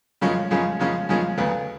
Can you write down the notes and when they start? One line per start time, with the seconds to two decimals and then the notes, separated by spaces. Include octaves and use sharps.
0.21 F#2 C#3 F3 G#3 C#4
0.51 F#2 C#3 F3 G#3 C#4
0.80 F#2 C#3 F3 G#3 C#4
1.09 F#2 C#3 F3 G#3 C#4
1.37 D2 C#3 F#3 B3